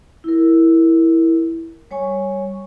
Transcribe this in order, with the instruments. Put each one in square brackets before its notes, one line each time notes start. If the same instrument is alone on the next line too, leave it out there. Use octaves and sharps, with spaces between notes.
[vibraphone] E4 A#4
G3 C#5 G#5 C#6